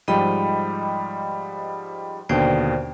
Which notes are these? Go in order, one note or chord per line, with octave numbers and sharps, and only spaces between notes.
G#2 F3 G3 D#5 G5 B5
D#2 B2 D3 C5 D5 G5